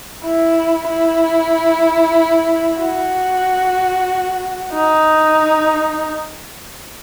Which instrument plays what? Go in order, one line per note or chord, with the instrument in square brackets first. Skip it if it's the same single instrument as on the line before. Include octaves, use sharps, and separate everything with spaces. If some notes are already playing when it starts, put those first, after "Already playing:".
[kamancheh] E4
E4
F#4
D#4